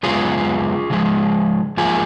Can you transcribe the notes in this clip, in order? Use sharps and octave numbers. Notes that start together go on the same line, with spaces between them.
F#2 C#3 G#3 B3 F4 G#4
C#3 F3 G#3
G#2 F3 A#3 F4 G#4